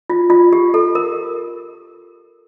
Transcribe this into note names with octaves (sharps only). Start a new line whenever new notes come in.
F4
F4
G4
A4
A#4